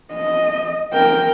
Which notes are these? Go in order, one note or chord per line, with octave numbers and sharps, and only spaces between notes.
D#5
A#4 G5